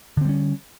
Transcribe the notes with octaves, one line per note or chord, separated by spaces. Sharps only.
D3 G3 C4 C#4